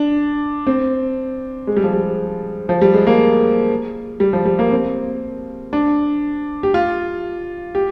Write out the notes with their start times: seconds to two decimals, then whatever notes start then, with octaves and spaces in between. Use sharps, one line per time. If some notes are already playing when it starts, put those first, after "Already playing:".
Already playing: D4
0.67 C4
1.67 G#3
1.77 G3
1.84 F3
1.93 G3
2.69 F3
2.81 G3
2.94 G#3
3.07 A#3
4.20 G3
4.33 F3
4.45 G3
4.59 A#3
4.71 C4
5.73 D4
6.63 G4
6.74 F4
7.75 G4